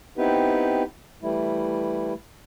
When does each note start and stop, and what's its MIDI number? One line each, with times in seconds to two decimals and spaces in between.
0.18 0.83 59
0.18 0.83 60
0.18 0.83 63
0.18 0.83 64
0.18 0.83 67
0.18 0.83 71
1.22 2.13 52
1.22 2.13 55
1.22 2.13 57
1.22 2.13 64